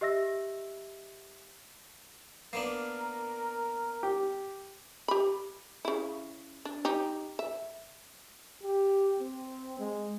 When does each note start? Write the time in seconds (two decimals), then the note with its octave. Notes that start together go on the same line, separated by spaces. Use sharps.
0.01 G4 D#5 E5 E6 A#6
2.53 A#3 B3 D4 A#4
4.03 G4
5.08 G4 B5
5.85 C#3 E4
6.65 D4
6.85 D#4 G4
7.39 E5
8.63 G4
9.20 C4
9.79 G#3